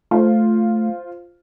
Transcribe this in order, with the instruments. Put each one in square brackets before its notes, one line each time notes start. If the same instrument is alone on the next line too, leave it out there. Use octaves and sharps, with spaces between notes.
[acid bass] A3 [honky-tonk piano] F4 C5